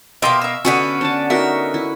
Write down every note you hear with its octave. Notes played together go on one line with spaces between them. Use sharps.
B2 A#3 G4 E5 F5 C6
E5 E6
D3 B3 C#4 F#4
D4 A5
D#4 F#4 A#4 E5
E4